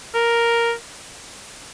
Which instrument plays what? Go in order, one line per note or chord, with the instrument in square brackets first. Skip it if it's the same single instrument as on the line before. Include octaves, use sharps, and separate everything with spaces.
[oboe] A#4